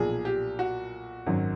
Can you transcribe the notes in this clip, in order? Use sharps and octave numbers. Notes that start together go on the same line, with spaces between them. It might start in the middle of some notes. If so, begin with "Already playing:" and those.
Already playing: B1 A#2 F3 G#4
G4
F#4
G#1 F#2 D#3 F#3